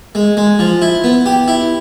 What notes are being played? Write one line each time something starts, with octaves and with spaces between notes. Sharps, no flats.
G#3
G#3
F3
E4
B3
G4
E4